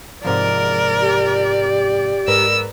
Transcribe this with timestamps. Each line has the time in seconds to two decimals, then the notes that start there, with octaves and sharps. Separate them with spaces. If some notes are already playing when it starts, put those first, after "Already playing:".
0.25 G#2 C3 F3 A#4 D5
1.01 G4
2.28 G#2 A#4 B4 E6